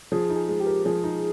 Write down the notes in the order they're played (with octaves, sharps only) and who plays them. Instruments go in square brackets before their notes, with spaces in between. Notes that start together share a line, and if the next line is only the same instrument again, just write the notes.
[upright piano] F3 [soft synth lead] G#4
[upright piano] D#4
[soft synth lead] G#4
[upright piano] G#3
[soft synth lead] G4
[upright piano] A#4
[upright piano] F3 [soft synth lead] G#4
[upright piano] D#4